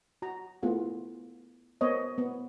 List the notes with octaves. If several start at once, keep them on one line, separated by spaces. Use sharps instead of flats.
F#4 A#5
A3 B3 E4 F4 G#4 F#5
B3 A#4 C5 C#5 D#5
B3